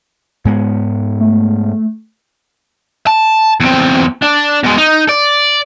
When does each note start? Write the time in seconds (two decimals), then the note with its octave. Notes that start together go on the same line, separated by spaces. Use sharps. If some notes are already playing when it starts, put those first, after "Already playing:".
0.45 G#2 G#3 B3
1.21 A3
3.07 A5
3.60 E2 C4
4.22 D4
4.63 B2 G#3
4.78 D#4
5.09 D5